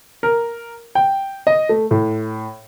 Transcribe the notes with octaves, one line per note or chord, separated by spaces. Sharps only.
A#4
G5
D#5
A3
A2